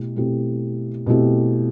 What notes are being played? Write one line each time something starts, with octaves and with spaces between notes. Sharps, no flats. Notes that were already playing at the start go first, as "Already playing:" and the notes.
Already playing: B2 A3 E4 G4
B2 A3 C4 E4 G4
B2 A3 C4 E4 G4